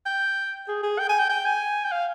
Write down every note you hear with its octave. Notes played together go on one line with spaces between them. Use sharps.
G5
G#4
G#4
G5
G#5
G5
G5
G#5
G5
F5